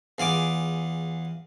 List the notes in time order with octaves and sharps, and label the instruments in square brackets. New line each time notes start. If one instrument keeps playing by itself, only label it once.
[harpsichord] E2 F4 G#4 D6